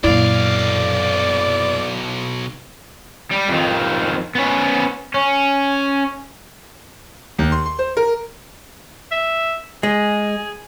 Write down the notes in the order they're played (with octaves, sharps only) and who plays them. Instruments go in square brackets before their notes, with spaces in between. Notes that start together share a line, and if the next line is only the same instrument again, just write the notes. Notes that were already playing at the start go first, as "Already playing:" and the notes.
[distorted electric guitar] B1 F5 [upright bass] F#2 A#2 [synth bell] E4 [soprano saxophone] D5
[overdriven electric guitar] G3
F2 D#3
B3 C#4
C#4
[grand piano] D#2
C6
C6
C5
A#4
[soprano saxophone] E5
[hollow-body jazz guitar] G#3 [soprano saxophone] G#4